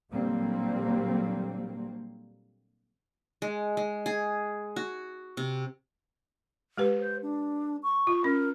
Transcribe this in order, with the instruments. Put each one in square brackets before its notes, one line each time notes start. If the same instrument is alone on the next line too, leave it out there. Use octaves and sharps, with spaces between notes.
[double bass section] A#2 D3 F#3 G3 A#3 C4
[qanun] G#3
G#3
G#4
F#4
C3
[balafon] G#3 G4 B4
[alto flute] C5
D4
C#6
[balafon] F4
[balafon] C#4 [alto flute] A#4